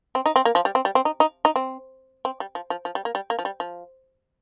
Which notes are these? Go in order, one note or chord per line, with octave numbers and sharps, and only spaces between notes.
C4
D#4
C4
A#3
F3
G3
C4
G3
C4
D#4
D#4
D#4
C4
C4
G3
F3
F3
F3
G3
A#3
G3
A#3
F3
G3
F3